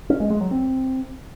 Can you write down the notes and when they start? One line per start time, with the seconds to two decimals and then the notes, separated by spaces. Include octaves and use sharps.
0.10 C#4
0.20 G#3
0.30 G#3
0.41 F#3
0.51 C4